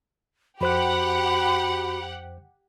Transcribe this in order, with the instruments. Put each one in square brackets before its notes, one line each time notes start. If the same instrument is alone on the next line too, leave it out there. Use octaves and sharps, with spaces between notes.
[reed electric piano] F2 C5 F#6 [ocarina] F#4 [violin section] G4 F#5 [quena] B5